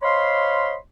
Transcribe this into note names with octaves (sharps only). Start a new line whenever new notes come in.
C5 C#5 D#5 F5 B5 C6